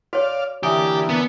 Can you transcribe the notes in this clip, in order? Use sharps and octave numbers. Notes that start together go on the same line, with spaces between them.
F#4 C#5 D5 F5
D3 E3 A#3 G4 E5 G#5 D#6
B3